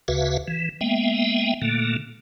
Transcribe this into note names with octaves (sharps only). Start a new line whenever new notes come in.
D2 C#3 F#4 B4 E5 F5
E3
G#3 A#3 B3 E5 G5
A#2 D3 A3 A#3